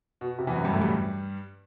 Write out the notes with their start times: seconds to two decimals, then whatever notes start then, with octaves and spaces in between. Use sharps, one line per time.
0.21 B2
0.39 C3
0.47 E2 E3
0.55 F#2 F#3
0.64 G2 G3
0.73 A2 A3
0.82 G2 G3